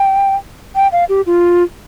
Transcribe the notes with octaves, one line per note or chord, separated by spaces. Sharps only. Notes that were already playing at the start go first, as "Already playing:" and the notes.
Already playing: G5
G5
F5
G4
F4